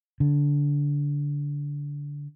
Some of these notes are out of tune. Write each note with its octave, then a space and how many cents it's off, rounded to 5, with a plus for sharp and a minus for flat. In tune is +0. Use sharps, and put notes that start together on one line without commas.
D3 -20